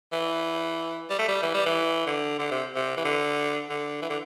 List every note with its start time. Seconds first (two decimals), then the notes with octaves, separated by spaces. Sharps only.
0.13 E3
1.10 G3
1.19 A3
1.28 G3
1.42 E3
1.54 G3
1.66 E3
2.07 D3
2.39 D3
2.52 C3
2.75 C3
2.97 E3
3.05 D3
3.69 D3
4.02 E3
4.10 D3